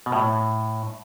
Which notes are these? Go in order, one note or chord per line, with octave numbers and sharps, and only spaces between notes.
B2
A2